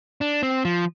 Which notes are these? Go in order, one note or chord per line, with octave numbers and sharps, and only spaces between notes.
D4
C4
F3